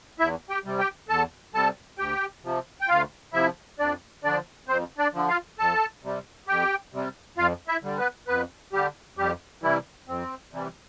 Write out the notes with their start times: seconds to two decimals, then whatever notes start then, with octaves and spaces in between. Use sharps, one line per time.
0.19 E2 E4 E5
0.50 G4 G5
0.65 C3 G3
0.79 G4 G5
1.09 E2 A4 A5
1.54 C3 G3 A4 A5
1.98 D2 G4 G5
2.44 C3 F3
2.81 G5
2.88 D2 F4 F5
3.33 C3 F3 E4 E5
3.79 F2 D4 D5
4.24 D3 F3 D4 D5
4.68 F2 C4 C5
4.98 D4 D5
5.13 D3 F3
5.28 F4 F5
5.58 F2 A4 A5
6.03 C3 G3
6.48 F2 G4 G5
6.92 C3 G3
7.37 F2 F4 F5
7.68 E4 E5
7.82 D3 G3
7.98 B3 B4
8.27 F2 B3 B4
8.73 D3 G3 G4
9.17 F2 G3 G4
9.62 C3 E3 G3 E4
10.08 F2 C4
10.52 C3 E3 G3